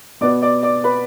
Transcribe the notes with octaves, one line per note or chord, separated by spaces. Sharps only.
B2 B3 D5 D6
D5 D6
D5 D6
B4 B5